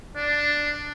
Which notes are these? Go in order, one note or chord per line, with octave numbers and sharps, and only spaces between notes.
D4